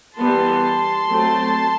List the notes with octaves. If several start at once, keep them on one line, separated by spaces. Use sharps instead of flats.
E3 G3 B3 A5 C6
F#3 A3 C4